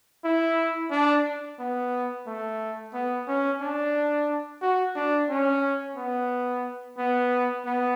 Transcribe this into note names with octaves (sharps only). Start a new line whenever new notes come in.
E4
D4
B3
A3
B3
C#4
D4
F#4
D4
C#4
B3
B3
B3